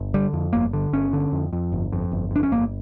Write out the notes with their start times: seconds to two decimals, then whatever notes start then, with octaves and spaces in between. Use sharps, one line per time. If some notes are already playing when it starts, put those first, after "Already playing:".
Already playing: G1
0.14 D3 G3
0.33 F2
0.53 G1 A#3
0.73 D3
0.93 G1 C#4
1.13 D3
1.32 F2
1.53 F2
1.72 G1
1.92 F2
2.12 G1
2.31 F2 D4
2.43 C#4
2.52 G1 A#3